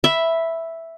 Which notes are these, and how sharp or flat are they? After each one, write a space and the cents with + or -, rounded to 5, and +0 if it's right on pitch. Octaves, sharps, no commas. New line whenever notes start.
E5 +0 B5 +0